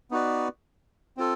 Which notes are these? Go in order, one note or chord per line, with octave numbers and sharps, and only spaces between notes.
B3 D#4 F#4 B4 D5
C4 F4 A4